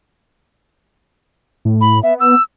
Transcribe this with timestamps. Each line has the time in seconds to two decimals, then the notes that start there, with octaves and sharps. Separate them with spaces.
1.65 A2
1.81 B5
2.03 B3 E5
2.20 E6